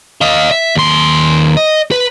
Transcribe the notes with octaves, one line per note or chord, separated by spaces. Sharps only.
D#5 F5
E5
D#2 C6
D#5
B4